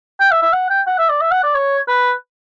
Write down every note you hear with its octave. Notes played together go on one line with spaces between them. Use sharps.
G5
E5
E5
F#5
G5
F#5
E5
D5
E5
F#5
D5
C#5
B4